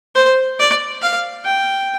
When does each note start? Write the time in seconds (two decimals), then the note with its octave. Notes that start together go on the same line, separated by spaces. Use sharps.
0.15 C5
0.59 D5
1.02 F5
1.45 G5